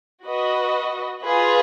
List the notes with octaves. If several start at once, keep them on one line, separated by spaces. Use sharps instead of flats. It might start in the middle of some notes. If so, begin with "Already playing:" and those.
F#4 B4 D#5
F4 G#4 B4